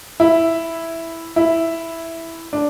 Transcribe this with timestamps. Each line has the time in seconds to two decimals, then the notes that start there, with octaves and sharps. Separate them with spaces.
0.20 E4
1.36 E4
2.53 D4